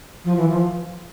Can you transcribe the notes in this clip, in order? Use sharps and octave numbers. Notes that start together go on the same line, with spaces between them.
F3
E3
F3